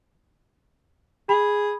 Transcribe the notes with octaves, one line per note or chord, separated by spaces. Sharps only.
G#4 B5